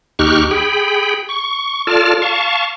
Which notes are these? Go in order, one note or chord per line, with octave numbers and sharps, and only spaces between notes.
D#2 D#4 G4 C#6 F6 F#6
G#4 G5 B5
C#6
F4 A4 D5 A5 F6
F5 A5 C#6